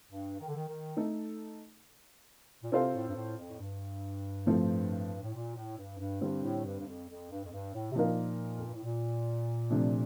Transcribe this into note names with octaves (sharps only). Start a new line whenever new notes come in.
G2
D#3
D3
D#3
D#3
A3 D#4 A4
A#2
C3 C4 F4 A4 C5 F5
A2
G2
A2
F2
A2
G2
A2 F3 A3 C4
A2
A#2
A2
G2
G2
G2 D3 G3 C4
A2
G2
G2
F2
F2
G2
F2
G2
A2
C3
A#2 F3 A#3 D#4 A#4 F5
F2
G2
A2
A#2
C3 F3 A3 D4